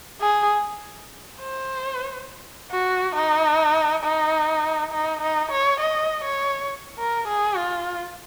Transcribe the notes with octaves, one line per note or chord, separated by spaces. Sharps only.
G#4
C5
F#4
D#4
D#4
D#4
D#4
C#5
D#5
C#5
A#4
G#4
F4